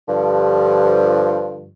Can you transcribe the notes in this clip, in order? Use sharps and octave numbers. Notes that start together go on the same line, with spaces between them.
G2 D3 F3